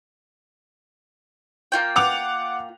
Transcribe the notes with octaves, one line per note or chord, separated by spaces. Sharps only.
A#3 F4 G5
F#5 D6 F7